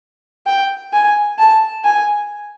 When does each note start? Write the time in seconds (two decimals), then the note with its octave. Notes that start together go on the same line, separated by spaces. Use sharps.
0.46 G5
0.93 G#5
1.38 A5
1.85 G#5